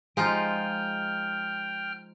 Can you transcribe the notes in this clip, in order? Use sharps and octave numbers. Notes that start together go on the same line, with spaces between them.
F3 G#3 D#4 F4 G5 F6